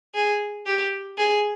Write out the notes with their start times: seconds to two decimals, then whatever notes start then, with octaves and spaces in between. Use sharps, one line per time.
0.15 G#4
0.66 G4
1.18 G#4